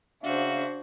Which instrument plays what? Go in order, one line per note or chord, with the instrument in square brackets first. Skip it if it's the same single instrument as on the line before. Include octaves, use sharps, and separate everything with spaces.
[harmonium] C#3 E5 F5 [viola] D4 C5 [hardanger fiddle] F#4